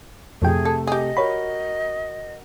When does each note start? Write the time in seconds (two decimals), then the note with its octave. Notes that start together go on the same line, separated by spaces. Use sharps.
0.42 F2 C3 F3 A3 G#4 G5
0.65 A4
0.87 G4 G#4 D#5
1.17 F#4 A#4 C#5 B5